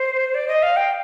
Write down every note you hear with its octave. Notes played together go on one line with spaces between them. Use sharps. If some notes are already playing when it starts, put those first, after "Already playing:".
Already playing: C5
D5
D#5
F5
G5